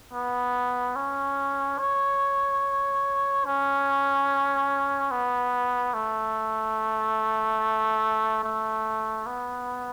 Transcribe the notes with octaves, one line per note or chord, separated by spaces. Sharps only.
B3
C#4
C#5
C#4
B3
A3
A3
B3